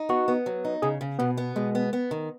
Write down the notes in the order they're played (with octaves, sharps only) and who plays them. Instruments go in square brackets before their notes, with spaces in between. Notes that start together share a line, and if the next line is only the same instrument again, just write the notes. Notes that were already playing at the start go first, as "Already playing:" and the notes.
Already playing: [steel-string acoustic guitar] D#4
[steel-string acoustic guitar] B3 [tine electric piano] F#4
[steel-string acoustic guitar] B3
F#3
D#4
[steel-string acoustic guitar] C#3 [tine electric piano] G#4
[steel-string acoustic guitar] C#3
[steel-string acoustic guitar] B2 [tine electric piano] B3
[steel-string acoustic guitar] B3
[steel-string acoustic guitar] B2 [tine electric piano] G#3
[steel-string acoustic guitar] B3
B3
D#3